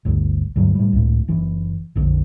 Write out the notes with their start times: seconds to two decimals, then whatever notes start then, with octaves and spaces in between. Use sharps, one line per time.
0.05 G1 D2
0.56 D2 G2 F#3
0.75 A2 G3
0.93 C#2 A2
1.28 F#1 E3
1.96 A#1 F2 D3